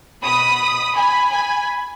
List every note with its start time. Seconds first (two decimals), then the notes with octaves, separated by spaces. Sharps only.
0.24 B2 B5 D#6
0.96 G#5 B5
1.32 G#5 B5